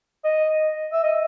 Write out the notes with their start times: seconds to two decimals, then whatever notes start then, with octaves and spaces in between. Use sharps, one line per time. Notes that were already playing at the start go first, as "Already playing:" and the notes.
0.24 D#5
0.93 E5
1.04 D#5